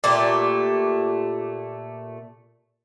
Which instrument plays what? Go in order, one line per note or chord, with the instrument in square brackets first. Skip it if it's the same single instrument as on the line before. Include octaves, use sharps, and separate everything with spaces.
[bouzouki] A#2 A3 G4